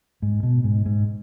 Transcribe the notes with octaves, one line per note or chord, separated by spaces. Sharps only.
G#2
B2
G#2
G#2